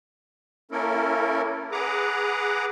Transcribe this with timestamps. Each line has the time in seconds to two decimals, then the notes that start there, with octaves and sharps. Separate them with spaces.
0.71 A#3 C#4 E4 A4 A#4
1.72 G#4 B4 F#5 A#5 D6